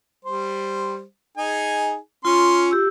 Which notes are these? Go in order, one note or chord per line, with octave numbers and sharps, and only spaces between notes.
G3 C5
D#4 G#4 G#5
C#4 F4 C6
G4 E6